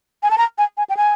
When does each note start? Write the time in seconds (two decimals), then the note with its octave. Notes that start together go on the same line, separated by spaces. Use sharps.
0.23 G#5
0.31 A5
0.38 A#5
0.58 G#5
0.77 G#5
0.89 G5
0.97 G#5